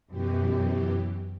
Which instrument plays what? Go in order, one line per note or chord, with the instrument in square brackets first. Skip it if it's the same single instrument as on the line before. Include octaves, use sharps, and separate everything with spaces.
[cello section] F#2 [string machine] B2 E3 G4